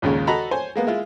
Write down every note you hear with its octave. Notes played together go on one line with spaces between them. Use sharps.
A#1 D#2 C#3 G#3 A#3
F#4 A4 D#5 A#5 B5
C5 C#5 G#5
G#3 A#3 B3
G#3 E4 F4